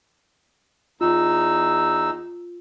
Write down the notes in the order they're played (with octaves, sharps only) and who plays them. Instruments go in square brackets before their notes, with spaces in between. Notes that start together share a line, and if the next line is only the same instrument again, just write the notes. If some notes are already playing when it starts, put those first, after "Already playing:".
[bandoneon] E2 D#4 E6 [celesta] F4